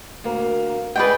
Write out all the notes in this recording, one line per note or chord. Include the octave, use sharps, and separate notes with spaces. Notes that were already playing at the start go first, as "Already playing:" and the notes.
D2 A#3
G#3 G#4 B4 D5 G5